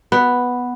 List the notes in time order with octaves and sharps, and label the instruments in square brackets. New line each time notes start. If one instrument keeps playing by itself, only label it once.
[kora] B3